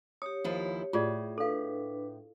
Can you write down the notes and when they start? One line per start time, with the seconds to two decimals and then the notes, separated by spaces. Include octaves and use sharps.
0.22 G4 C#5 D#6
0.44 D#2 F3 E4
0.93 A2 F4 G#4 D5
1.38 D4 A4 B4 F5